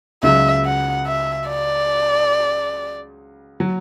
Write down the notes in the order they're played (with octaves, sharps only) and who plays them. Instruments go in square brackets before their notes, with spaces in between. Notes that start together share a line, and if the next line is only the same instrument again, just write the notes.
[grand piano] C#2 C#3 F#3 [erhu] E5
[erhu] F#5
E5
D5
[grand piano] F#3